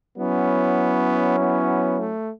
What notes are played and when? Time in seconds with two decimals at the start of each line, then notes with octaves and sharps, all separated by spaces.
0.17 F#3 B3 C#4 E4
1.39 B3
1.99 A3